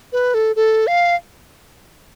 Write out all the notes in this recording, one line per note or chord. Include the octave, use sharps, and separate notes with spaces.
B4
A4
A4
F5